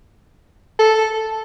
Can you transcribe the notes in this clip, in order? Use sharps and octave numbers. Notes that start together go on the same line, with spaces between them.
A4